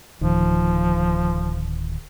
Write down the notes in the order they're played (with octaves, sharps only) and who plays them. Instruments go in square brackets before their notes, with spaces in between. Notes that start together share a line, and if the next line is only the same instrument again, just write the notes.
[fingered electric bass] D1 D#3 [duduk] F3